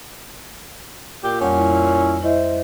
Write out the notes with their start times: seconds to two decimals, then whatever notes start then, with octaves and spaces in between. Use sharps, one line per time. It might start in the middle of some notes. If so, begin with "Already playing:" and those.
1.24 A#2 G4
1.41 F2 G3 C#4 F#5
1.55 E4
2.22 E4 C5 D#5 E5